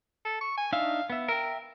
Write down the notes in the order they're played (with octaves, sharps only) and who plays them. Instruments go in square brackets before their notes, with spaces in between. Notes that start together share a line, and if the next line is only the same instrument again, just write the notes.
[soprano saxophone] A4
C#6
G#5
[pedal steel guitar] D4 D#4 E5 [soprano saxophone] F5
[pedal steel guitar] B3 E5
[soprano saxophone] A#4 [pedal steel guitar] E5 G5